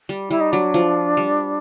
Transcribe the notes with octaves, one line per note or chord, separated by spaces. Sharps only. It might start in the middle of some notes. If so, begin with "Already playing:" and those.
G3
G3 E4
D#4
F#3 D4
F3
G3